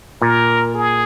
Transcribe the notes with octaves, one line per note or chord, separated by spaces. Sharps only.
A#2 A#4
G#4